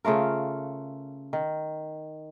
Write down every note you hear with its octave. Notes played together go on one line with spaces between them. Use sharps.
C#3 A3 F4 A#4
D#3